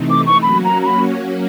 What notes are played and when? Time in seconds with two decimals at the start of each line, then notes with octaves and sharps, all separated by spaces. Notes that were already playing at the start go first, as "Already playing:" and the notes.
Already playing: C3 E3 A3 C4 D#4
0.10 D6
0.26 C#6
0.42 F#3 A#3 C#4 F#4 B5
0.65 A#5
0.82 A#5
0.86 B5